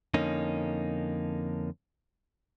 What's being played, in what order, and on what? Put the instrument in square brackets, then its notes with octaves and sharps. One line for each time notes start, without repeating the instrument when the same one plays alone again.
[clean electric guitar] F2 D3 A#3 C#4 D#4